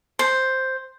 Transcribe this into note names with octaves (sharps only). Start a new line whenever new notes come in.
C5